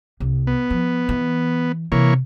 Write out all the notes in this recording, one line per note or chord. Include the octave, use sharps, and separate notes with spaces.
C2
B3
F3
E3
C3 E3 A#3 C#5